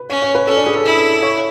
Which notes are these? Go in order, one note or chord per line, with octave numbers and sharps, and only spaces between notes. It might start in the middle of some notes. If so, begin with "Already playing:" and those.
Already playing: B4
C#4 C#5
C#5
B4
C#4 A4
D4
G#4
A4
E4
C#5